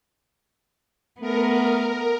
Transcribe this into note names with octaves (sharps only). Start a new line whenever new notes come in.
A3 B3 A#4